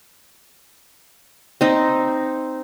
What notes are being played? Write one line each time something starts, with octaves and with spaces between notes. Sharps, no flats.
C4 D#4